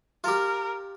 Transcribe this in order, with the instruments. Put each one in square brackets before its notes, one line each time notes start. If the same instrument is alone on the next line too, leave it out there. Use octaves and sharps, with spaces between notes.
[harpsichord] F4 G4 [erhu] A#4